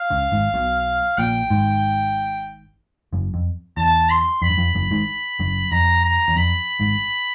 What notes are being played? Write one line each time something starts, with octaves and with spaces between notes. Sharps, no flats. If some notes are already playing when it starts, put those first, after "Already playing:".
Already playing: F5
C#2 C#3
G#1 G#2
B1 B2
A#1 A#2 G5
G#1 G#2
F#1 F#2
F2
E2 A5
C6
F2 B5
F#2
F2
F#1 F#2
G#1 G#2
F#1 F#2
F2 A#5
A#5
E2
F2 B5
G#1 G#2